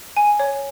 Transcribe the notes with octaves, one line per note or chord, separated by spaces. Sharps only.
G#5
C#5